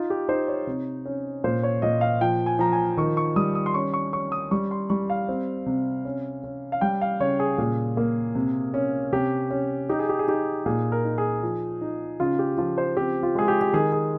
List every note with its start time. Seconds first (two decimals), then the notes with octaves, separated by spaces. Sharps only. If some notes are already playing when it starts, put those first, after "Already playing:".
Already playing: D#4 F4
0.10 G4
0.28 D#4 C5
0.48 C#5
0.67 C3
1.06 C#4
1.44 A#2 C5
1.63 C#5
1.82 A#2 D#5
2.01 F5
2.21 F3 G5
2.46 G#5
2.59 F3 A#5
2.72 G#5
2.97 D#3 C#6
3.17 C#6
3.36 G3 D#6
3.55 D#6
3.66 C6
3.74 C#4 C#6
3.94 C#6
4.13 C#4 C#6
4.32 D#6
4.51 G3 C#6
4.71 C6
4.90 G3 C#6
5.10 F5
5.29 C4
5.66 C3
6.05 C#4
6.44 C#4
6.72 F5
6.81 G3 G5
7.01 F5
7.20 C#3 C#5
7.40 G#4
7.58 A#2
7.97 A#3
8.35 C3
8.74 C#4
9.12 C3 G4
9.51 C#4
9.89 D#4 G4
9.99 G#4
10.09 G4
10.19 G#4
10.28 D#4 G4
10.66 A#2 G#4
10.92 A#4
11.04 D#4
11.18 G#4
11.43 F3
11.81 D#4
12.20 C#3 F4
12.39 G4
12.58 F3 F4
12.78 C5
12.97 C4 G4
13.23 F4
13.35 G#3 G#4
13.48 G4
13.61 G4
13.73 D#3 G#4
13.92 G#4